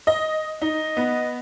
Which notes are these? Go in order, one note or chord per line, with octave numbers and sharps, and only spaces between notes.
D#5
D#4 D#5
B3